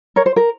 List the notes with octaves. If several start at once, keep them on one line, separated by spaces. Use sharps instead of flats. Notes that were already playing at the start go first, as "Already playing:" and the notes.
A#4 C#5
C5
A#4